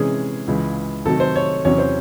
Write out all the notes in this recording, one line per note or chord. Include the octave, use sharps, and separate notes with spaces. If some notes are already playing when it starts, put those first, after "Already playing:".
Already playing: C3 E3 G#3 C#4 G#4
C#2 C#3 E3
C3 D#3 F#3 A3 A4
C5
C#5
E2 C3 F#3 C#4 C#5
C5